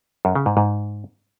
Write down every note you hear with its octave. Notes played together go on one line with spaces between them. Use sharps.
F#2
C#3
G#2
G#2